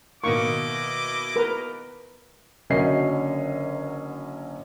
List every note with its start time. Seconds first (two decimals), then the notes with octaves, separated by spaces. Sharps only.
0.24 B2 D#3 A#3 E4 D#5 C#6 D6
1.36 A#4 B4 A#5
2.70 F#1 D3 F#3 C#4 D#5 C7